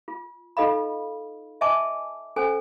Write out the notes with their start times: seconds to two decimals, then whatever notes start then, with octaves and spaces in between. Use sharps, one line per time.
0.08 F4
0.57 D#4 F4 A4 D#5 F5 B5
1.61 D#5 E5 G#5 A5 C#6 D6
2.36 C#4 A4 C5 G#5